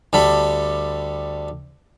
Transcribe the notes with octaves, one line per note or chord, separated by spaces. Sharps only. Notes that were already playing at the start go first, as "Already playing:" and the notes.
D2 G3 A4 B5